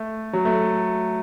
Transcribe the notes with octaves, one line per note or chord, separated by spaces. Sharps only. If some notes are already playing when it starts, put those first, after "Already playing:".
Already playing: A3
F#3
A3